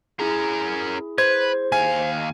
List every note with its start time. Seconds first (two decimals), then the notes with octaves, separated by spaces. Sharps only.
0.20 C#4 E4 G#4 A#4
1.18 B4 C5 G#6
1.72 D#2 F5 G#5